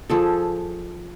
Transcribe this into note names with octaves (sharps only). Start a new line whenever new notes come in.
F3 G#4 A4